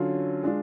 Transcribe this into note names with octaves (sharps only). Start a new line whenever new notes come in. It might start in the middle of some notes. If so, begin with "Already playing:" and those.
Already playing: D3 F#3 C#4 F4
G#3 D4 F4